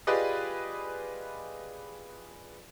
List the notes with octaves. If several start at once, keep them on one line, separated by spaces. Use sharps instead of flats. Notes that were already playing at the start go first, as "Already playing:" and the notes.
F4 G4 G#4 B4 D5 D#5